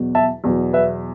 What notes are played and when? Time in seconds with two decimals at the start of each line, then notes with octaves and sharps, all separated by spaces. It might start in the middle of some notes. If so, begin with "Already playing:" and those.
Already playing: E2 B2 F#3
0.15 E5 A5
0.44 E2 B2 F#3
0.73 B4 E5